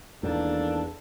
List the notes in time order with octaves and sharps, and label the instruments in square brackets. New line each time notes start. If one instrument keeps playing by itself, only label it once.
[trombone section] G#1 A#3 A4 [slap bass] E2 [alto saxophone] D4